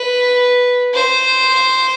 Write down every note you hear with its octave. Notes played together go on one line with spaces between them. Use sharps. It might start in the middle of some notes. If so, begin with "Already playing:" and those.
Already playing: B4
C5